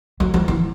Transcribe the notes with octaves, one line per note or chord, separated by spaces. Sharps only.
F#3
F3
E3